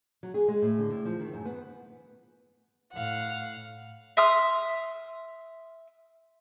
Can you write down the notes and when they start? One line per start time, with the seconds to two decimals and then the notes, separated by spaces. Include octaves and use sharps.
0.23 F#3
0.34 G#4
0.48 G#3
0.62 A2
0.79 D3
0.91 A2
1.05 F3
1.20 D#3
1.34 F#2
1.45 B3
2.93 A2 F5 F#5
4.17 E5 C6 D#6 F6